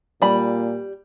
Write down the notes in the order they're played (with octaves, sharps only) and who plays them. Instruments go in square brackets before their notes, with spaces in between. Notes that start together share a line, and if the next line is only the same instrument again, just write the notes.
[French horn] A#2 [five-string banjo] G3 B5